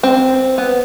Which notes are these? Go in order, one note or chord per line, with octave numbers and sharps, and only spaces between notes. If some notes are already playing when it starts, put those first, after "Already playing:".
C4
B3